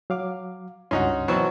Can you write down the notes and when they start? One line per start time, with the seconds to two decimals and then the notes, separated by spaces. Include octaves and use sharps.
0.10 F#3 F5 D6
0.91 C#2 G2 C#4 D#4 F#4 C6
1.28 B2 E3 F#3 C4 F#4